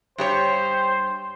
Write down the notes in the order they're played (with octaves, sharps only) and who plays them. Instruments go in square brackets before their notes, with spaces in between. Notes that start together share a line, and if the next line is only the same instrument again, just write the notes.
[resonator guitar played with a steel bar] G2 G4 C#5 [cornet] C5